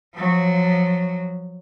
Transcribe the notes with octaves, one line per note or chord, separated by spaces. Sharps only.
F3 F#3